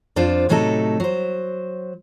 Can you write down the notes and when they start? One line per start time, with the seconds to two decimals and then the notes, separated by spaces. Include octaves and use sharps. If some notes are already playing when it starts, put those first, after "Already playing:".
0.16 F2 D4 F4 C5
0.49 A2 C3 F#3 A3 D#4 A4
1.00 F#3 C5